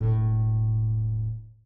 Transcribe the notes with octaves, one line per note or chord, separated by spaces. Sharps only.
E1 A2